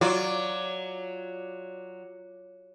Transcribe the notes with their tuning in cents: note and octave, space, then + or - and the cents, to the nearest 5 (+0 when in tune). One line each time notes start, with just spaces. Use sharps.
F#3 +0 F4 +0 D5 +0